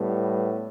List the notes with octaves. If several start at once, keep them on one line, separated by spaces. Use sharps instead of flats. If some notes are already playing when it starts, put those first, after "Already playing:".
Already playing: A2 G3 B3